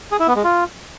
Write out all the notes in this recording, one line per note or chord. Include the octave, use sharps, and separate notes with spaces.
G#4
E4
B3
G#3
F4